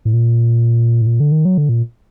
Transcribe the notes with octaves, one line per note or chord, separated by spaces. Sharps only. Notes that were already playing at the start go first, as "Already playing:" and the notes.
A2
A#2
A2
A#2
D3
D#3
F#3
D3
A#2